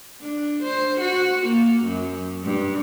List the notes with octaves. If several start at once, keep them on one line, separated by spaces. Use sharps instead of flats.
D4
C5
F#4
A#3
F#2
G2